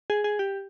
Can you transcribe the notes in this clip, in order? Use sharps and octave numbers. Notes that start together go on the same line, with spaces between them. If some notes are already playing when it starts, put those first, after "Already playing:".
G#4
G#4
G4